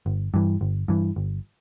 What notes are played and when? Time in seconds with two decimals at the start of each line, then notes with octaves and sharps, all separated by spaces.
0.06 G1
0.34 G2 E3
0.61 G1
0.88 G2 E3
1.16 G1